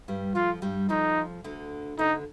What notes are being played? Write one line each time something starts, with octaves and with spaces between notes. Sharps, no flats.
G2 G3
F2 F3 F4
G2 G3
F2 F3 D#4
D2 D3
D2 D3 D#4